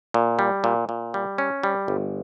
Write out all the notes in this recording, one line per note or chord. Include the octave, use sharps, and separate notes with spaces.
A#2
G3
A#2
A#2
G3
C#4
G3
G1